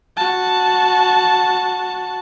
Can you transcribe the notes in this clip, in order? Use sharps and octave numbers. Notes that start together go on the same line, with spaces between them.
F#4 A5